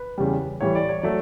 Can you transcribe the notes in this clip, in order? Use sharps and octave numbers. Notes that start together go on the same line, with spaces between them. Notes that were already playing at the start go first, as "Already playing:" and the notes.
Already playing: B4
E2 C#3 G3
A2 E3 G3 C#5
D5
C#5
F#3 A3 D5